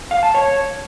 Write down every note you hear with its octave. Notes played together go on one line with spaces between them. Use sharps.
F5
A5
C#5